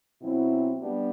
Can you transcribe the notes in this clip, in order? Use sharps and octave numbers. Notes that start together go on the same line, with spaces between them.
B2 F#3 C4 E4
G3 B3 D4 G4